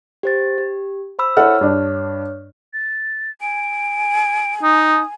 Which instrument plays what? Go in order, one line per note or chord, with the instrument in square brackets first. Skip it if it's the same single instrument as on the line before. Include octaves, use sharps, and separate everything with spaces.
[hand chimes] G4 C5 A6
G4
C5 B5 E6
[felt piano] E4 A4 F#5 [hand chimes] C#5 F6
[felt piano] G2 D4
[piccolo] A6
[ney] G#5 [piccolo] D7
[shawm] D#4 [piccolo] D#6